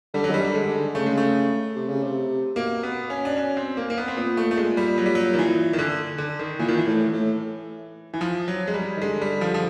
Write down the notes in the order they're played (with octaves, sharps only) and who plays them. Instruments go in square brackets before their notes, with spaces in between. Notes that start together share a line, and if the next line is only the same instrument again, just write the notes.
[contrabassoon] D3 [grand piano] G3
[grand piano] F#3
[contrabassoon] D#3 [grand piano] G3
[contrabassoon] D3
[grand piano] G#3
[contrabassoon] D3
[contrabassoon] C#3 [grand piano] A3
[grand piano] G#3
A3
[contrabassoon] C3
C#3
C3
[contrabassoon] B2 [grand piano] A#3
[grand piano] B3
C#4
D4
C#4
C4
A#3
A#3
B3
C4
[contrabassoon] A#2 [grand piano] B3
[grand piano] A3
A3
G#3
G3
F#3
G3
F#3
D#3
E3
D#3
D3
D3
D#3
[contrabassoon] A#2 [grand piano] E3
[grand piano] D#3
E3
[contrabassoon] A2
A2
[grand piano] E3
F3
F#3
G#3
G3
[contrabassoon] D#3
[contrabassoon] D3 [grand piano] G#3
[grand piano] G3
F3
F3